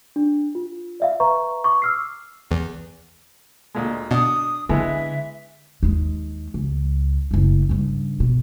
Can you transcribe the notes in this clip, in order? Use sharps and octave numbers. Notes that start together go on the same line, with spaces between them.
D4
F4
D5 E5 F5
B4 E5 A#5 C#6
C#6 D6
E6 F6 C7
E2
D2 A#2 G#3
B2 D4 D#6
D3 E3 G#3 B3 E5
D#2 G#3
C#2
F#1 A3
G2 C#3
B2